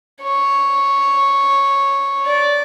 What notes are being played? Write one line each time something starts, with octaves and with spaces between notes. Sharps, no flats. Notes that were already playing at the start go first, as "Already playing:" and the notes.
C#5
D5